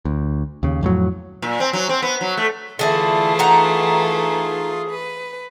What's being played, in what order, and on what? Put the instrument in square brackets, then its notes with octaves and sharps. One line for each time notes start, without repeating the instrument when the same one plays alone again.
[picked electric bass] D2
D#2 C#3
F2 A2 F#3
[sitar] A#2
C4
F#3
C4
B3
F#3
A3
[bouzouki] D3 D4 E4 [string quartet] E3 A3 F4 [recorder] G#4
[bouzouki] D#4 F#5 A#5
[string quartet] B4